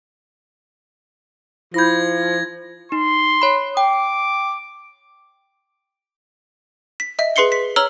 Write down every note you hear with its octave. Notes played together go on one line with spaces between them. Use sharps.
F3 E4 B5 G6 G#6 A#6
D#4 C6
C#5 B5
G5 D6
B6
D#5 E5 B6
G#4 B4 C6 C7 C#7 G7
B6
C#5 A#5 E6 F6 F#7 G7